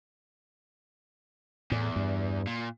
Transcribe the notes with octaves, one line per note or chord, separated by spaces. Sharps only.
E2 A2
G2
A#2